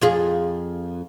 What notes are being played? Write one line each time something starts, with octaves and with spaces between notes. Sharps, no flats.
F2 F4 G#4